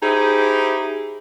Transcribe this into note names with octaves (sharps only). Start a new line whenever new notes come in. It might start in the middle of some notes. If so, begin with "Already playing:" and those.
D#4 E4 G4 G#4 C5